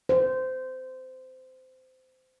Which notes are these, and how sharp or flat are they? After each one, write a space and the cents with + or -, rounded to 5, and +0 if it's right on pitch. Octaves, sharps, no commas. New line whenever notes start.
C5 -20